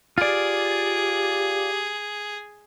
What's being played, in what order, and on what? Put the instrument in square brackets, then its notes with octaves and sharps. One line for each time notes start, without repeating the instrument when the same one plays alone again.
[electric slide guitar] F4 D5 [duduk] G4 [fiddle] G#4